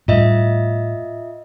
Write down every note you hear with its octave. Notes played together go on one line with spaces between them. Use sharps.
A2 G3 F4 D#5 E5